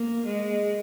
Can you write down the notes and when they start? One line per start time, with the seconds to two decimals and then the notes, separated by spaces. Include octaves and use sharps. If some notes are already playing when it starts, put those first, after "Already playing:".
Already playing: A#3
0.26 G#3